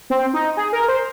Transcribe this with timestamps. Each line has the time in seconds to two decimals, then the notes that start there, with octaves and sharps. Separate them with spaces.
0.10 C4
0.34 D#4
0.57 G#4
0.73 A#4
0.88 C5